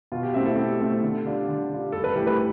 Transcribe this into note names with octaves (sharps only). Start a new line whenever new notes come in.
B2 F4
G4
A3 C4 E4 E5
A4
B2 G4
A3 C4 E4
D3
G3 D4 F4
D3
G3 D4 F4
G2 A4
B4
E3 A3 G4
B4